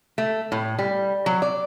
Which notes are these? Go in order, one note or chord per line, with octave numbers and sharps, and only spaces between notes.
A3
A2
G3
F#3
D5